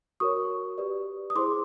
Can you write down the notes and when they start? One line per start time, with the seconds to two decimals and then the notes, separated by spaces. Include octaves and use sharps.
0.20 F#4 A#4 C#5 C#6 D#6
0.78 G4 B4 D5
1.30 D#6
1.35 E4 G#4 C5 C6 D6